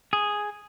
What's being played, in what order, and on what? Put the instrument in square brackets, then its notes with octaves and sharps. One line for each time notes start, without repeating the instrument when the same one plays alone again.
[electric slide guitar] G#4